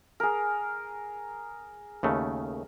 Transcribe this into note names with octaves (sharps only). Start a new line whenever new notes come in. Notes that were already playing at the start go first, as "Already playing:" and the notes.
G#4 A#4
D#2 C#3 A3